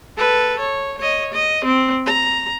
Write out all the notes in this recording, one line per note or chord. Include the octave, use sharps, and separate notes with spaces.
A4 B4
C#5
C#5 D#5
D#5
C4
A#5